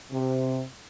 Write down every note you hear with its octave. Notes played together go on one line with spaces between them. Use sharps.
C3